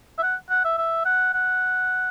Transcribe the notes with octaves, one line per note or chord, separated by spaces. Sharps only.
E5
F#5
F#5
E5
E5
F#5
F#5